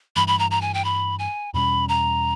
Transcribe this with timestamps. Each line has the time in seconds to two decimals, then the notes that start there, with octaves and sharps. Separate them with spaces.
0.16 G2 E3 G3 B5
0.28 B5
0.39 A#5
0.51 A#5
0.62 G#5
0.74 G5
0.85 B5
1.19 G#5
1.54 E2 B2 G3 C#4 B5
1.89 A#5